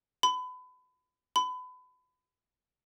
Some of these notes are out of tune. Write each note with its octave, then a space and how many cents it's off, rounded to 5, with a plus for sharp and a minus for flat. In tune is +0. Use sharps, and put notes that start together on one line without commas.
B5 +30
B5 +30